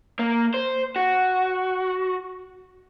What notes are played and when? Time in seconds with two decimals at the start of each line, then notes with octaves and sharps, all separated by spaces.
0.19 A#3
0.54 C5
0.96 F#4